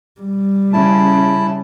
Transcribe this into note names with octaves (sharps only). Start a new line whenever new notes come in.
G3
C#3 E4 A5